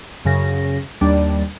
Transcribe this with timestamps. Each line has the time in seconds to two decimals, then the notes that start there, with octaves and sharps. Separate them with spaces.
0.25 F#2 C#3 A#6
1.01 D#2 G3 D4 D5